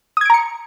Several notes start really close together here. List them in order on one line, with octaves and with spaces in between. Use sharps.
D#6 G#6 D7 A#5 C#7